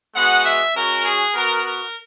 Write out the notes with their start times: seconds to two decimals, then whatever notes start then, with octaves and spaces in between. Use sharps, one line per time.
0.15 G#3 B3 F#4 F#5
0.45 E5
0.75 G#3 C#4 F#4 A#4
1.05 G#4
1.34 B3 F#4 A#4
1.64 A#4